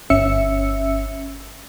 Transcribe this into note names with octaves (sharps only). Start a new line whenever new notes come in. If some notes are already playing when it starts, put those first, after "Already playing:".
G1 C#4 E5 E6 C#7